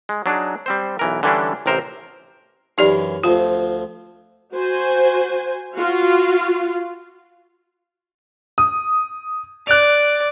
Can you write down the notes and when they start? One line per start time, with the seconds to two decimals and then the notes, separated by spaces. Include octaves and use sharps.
0.09 G#3
0.26 F#3 D4 D#4 G#4
0.66 G3 C4 C5
0.99 B1 E3 A#4
1.23 D3 E3 G3 C#4 D4
1.66 A1 C3 A#4 C5
2.78 F#2 E3 D#4 G4 D5
3.24 D2 F3 C4 F4
4.54 F#4 C5 G#5
5.74 F4 F#4 F5
8.58 D#6
9.67 D5 F#6 F7